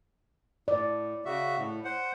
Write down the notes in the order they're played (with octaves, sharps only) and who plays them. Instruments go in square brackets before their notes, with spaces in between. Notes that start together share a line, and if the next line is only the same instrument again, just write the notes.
[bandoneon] A2 [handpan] D5
[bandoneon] C#3 F#4 E5
A2
C5 F#5